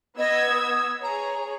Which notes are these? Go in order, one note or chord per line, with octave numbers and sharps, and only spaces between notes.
B3 D#5 E6 G#6
D#6
G#4 C#5 A#5